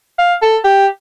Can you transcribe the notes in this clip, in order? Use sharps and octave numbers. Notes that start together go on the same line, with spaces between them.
F5
A4
G4